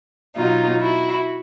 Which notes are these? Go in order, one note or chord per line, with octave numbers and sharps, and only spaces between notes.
B2 F#3 D#4 F4
E4 F#4